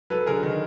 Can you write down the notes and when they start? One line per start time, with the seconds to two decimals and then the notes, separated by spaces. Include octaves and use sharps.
0.10 F#3 A4 B4
0.26 D3 G#4 A#4
0.43 D#3